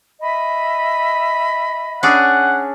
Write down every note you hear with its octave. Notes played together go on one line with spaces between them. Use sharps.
D#5 E5 B5
C#4 D4 G#4 F#5